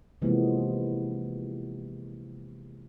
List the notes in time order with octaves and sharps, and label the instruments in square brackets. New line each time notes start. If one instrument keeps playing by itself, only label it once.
[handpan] C3 E3 F3 G#3 A#3 B3